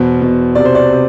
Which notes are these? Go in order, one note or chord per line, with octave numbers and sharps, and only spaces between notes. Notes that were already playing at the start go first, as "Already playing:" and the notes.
Already playing: E2 B2 C5
B2
C3 D5
C5
D5
C3